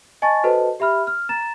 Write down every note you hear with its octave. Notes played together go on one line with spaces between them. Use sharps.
D#5 G#5 A5 C#6 A6
F#4 A4 B4 C5 D#5 A5
G4 E5 B5 F6
F6
A#5 A6 E7